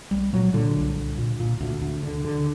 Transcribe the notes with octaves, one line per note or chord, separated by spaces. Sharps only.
C2 G3
A#2 F#3
A#2 D3
C2
C2
A#2
A#2
D2
D2
D3
D3